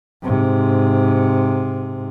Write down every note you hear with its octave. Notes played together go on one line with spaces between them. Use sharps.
G#2 C3